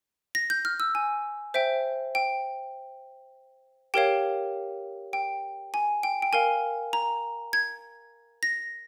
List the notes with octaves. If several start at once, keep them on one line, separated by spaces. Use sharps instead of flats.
A#6
G6
F6
E6
G#5
C5 E5 G5
G5
G4 A#4 C#5 F5 G5
G5
G#5
G5
G5
A#4 F5 G#5
A#5
G#6
A#6